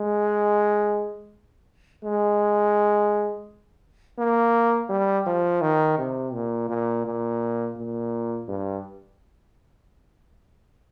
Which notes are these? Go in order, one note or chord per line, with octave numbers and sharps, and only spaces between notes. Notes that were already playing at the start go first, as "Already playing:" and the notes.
Already playing: G#3
G#3
A#3
G3
F3
D#3
C3
A#2
A#2
A#2
A#2
G2